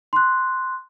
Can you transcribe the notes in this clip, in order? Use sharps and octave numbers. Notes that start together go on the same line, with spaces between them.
C6 F#6